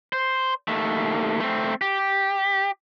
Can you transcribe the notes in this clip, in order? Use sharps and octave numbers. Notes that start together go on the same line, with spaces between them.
C5
D#2 A3
A3 C4
G4